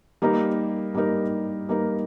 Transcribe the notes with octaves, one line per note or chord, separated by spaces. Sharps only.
G3 A#3 D#4 A#4
G3 A#3 D#4 A#4
G3 A#3 D#4 A#4